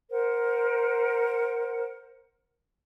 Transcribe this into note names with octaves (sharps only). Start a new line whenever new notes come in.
A#4 C5 F#5